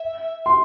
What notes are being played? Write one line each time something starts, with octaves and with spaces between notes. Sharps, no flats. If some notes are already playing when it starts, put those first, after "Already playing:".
Already playing: E5
C6